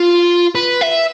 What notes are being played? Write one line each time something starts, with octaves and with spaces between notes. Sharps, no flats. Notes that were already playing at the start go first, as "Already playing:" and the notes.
Already playing: F4
B4
E5